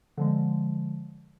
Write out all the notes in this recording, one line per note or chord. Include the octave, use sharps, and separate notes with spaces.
D3 F3 G#3